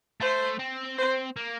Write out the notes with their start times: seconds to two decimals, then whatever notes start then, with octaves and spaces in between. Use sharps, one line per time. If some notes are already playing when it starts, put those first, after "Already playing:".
0.21 A3 C5
0.59 C4
0.98 C5
1.36 A#3